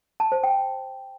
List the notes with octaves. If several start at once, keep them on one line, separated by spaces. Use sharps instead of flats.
A5
C5
G5